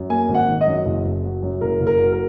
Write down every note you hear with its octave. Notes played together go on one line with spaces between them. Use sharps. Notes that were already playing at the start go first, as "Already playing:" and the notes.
Already playing: F#2
A#3 G#5
G#1
F#5
D#3
D#5
F#2
F#1
F#1
F#3
F#2
F#1 A#4
F#1
A#4
F#3
A#4